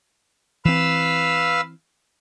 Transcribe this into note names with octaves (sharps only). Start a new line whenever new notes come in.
E3 C4 B4 F5 E6